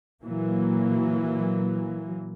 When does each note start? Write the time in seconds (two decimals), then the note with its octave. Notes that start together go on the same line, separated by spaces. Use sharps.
0.22 A#2 E3 F#3 A#3